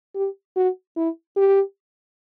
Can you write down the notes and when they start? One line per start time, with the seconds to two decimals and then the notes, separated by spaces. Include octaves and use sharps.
0.15 G4
0.56 F#4
0.96 E4
1.36 G4